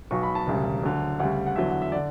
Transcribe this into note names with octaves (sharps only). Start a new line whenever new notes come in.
B1 B2 F#3 C#6
B5
A5
E1 D2 C#3 G3
D2 D3 F#3
D2 C#3 G3 F#5
F#5
E2 D3 F#3 E5
F#5
E5
D3 D5